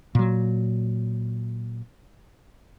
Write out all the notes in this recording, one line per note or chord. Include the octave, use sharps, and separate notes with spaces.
A#2 F#3